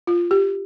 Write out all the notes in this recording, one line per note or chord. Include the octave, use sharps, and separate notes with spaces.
F4
G4